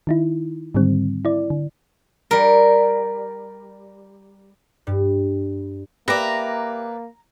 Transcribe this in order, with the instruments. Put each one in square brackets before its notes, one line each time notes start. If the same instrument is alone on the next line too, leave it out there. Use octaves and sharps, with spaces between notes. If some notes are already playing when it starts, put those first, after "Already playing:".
[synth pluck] D#3 D#4 E4
G#2 D3 D#3 G3 C4
E4 D5
D3
[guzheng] G3 A#4
[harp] G2
[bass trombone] A#3 [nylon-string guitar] G4 E5 [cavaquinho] B4 D5 [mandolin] A#5